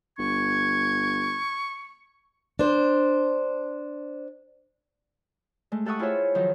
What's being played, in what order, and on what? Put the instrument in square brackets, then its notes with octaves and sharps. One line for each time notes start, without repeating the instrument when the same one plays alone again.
[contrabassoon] G1 [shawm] C#6 [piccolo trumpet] G#6
[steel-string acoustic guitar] D4 C5
[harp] G#3 A3
G4 A4 E5 F#5 C#6 D#6
E4 F4 G#4 C5 C#5 E5
D#3 F3 F#3 D#4